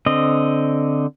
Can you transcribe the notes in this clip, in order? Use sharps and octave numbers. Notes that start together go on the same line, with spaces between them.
D3 C4 D#5